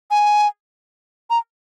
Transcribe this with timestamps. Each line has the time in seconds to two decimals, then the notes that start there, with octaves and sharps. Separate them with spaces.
0.11 G#5
1.30 A#5